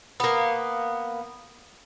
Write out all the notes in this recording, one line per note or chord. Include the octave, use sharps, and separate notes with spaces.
A#3 B3